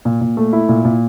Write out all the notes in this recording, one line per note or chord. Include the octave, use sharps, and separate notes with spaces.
A#2
A#2
A3
E4
A#2
A#2